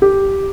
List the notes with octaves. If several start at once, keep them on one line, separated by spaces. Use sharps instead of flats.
G4